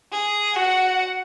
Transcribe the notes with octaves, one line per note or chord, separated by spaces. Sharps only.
G#4
F#4 F#5